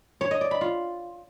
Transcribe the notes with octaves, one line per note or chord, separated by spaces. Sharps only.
C#5
D#5
D5
B5
F4